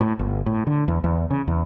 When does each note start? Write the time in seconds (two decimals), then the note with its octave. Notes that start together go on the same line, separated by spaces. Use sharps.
0.01 A2
0.19 G1
0.46 A2
0.67 D3
0.88 E2
1.04 E2
1.31 C#3
1.48 E2